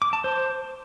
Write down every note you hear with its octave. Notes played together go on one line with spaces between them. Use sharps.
D6
A5
C5